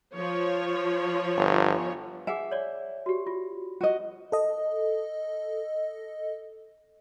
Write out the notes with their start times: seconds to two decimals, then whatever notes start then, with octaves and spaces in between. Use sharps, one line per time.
0.14 F3 C#5
1.36 G1
2.27 G#4 E5 F#5 G#5
2.51 C#5 D5
3.06 F#4 G4
3.27 F4
3.81 F#4 D#5
4.32 A4 D#5